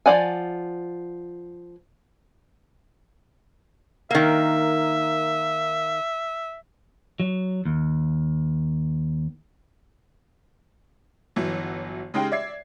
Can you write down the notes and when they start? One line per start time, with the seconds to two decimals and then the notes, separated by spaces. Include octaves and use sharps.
0.06 F3 D#4 D5 F#5 G#5
4.11 D#3 A#3 E5
7.20 F#3
7.65 D#2
11.36 G1 E3 F#3
12.14 C#3 G#3 D#4 G4 G5
12.32 D5 E5 G#6 C7